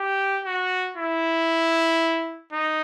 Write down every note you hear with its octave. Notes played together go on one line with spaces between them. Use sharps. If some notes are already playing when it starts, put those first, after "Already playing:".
Already playing: G4
F#4
E4
D#4